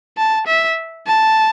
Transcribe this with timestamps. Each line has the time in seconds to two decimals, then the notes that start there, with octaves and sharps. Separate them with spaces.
0.17 A5
0.47 E5
1.07 A5